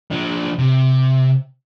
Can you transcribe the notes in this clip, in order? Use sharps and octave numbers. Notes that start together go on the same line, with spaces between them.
F3 D4
C3